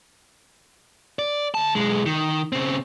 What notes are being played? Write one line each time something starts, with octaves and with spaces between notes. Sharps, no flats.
D5
D2 A5
B1 G#3
D#3
C#3 C4